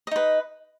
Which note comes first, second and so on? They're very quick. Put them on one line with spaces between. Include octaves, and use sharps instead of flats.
D#5 D#4 B4